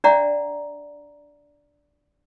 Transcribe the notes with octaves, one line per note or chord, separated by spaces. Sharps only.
D4 D5 E5 F#5 A#5